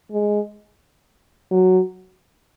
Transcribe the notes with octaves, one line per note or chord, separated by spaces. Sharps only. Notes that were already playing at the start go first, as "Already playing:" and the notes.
G#3
F#3